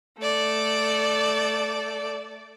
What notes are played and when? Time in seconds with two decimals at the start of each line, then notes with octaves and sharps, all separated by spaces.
0.18 A3 D5